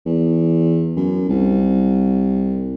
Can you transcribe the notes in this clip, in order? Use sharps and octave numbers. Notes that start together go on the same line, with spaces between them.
E2
F#2
C2